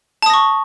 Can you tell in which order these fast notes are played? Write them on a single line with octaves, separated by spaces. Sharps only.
A5 D#6 A#6 C#6